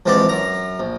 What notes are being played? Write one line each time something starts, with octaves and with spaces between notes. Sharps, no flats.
A#1 G#2 E3 C4 G4 D5
F#2 A#5
A#1